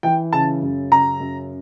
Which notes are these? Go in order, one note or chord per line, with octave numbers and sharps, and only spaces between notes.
E3 G5
C#3 A5
F#2
C#3 A#5
F#2